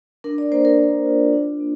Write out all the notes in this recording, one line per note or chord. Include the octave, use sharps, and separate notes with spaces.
D4 A#4
D5
A#3 C5
A#4
A#3
F4
D4
A#3